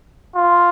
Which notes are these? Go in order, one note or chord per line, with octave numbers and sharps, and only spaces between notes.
F4